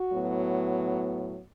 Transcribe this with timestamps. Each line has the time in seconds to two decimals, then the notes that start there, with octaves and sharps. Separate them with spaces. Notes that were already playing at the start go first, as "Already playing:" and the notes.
Already playing: F#4
0.12 A2 F#3 B3